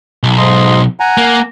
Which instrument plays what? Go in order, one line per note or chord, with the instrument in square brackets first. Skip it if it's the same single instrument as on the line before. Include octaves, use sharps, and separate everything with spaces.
[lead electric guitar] B1
[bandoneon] G#2 D#5 C6
F#5 G#5 A#5
[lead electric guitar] A#3